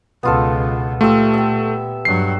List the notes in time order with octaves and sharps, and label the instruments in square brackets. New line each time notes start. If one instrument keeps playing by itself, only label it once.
[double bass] C#2 B2 [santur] B3 F4 A4
[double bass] A#2 [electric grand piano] A3 [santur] F4 G4 E5
[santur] E5 G5
[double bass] G2 F#3 [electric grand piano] C7